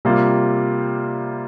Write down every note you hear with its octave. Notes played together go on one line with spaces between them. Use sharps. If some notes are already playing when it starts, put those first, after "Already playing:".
C3 G3 A#3 F4